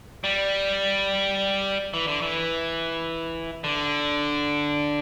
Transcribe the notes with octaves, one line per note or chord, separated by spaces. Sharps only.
G3
E3
D3
E3
D3